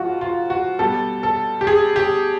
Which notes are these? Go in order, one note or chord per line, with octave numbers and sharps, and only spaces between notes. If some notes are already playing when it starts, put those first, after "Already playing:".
Already playing: G#2 F3 F4 F#4
F4
F#4
B2 G3 A4
A4
G4
G#4
G4